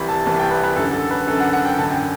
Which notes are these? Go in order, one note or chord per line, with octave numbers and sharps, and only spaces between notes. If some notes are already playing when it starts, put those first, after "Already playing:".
Already playing: C2 C3 E3 B5
A5
C2 C3 E3 A5
G5
B4
B4
F#2 D3 A4
A4
B4
F#2 D3 A4
F#5
F#5
G5
F#2 D3 A5
G5